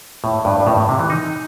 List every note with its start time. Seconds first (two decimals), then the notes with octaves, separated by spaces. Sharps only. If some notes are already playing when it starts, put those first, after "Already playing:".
0.24 A2
0.45 G2
0.60 G2
0.67 A2
0.77 A2
0.89 C3
0.99 E3
1.10 D#4